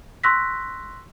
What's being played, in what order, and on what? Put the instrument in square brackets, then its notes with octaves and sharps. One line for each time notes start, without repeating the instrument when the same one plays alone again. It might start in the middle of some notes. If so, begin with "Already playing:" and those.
[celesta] C6 C#6 E6 F#6 A#6 B6